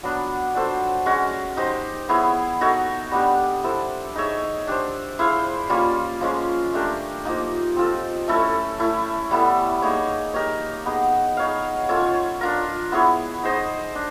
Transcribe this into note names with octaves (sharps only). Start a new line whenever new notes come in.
F#3 B3 D4
D4 F#4 A4 C5
G#3 C#4 F#4
D#4 G4 C5
B3 E4 G#4 C#5
D#4 F#4 A4 C#5
G3 B3 D4 G4
E4 A4 C5
D#4 G#4 C#5 E5
D4 G4 C5
E4 G#4 C5 F5
G3 A#3 C#4 F4
F3 G#3 C#4
A3 D4 G4 A#4
F3 A#3 D#4
C4 F4 A4
A3 C#4 E4 A4
A3 C#4 E4
G3 B3 E4 A4
A#3 D#4 G#4 C#5
D#4 G4 A#4 C#5
B3 D#4 G#4
D#4 G#4 C#5 F5
C#4 F4 A4 C#5
D4 F4 A#4
B3 E4 G#4 C#5
D#4 G#4 C5 D#5
D4